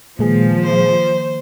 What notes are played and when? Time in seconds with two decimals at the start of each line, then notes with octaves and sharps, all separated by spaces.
0.19 A#2 D#3 F3 G#3 A#3 G#4 B4
0.64 C5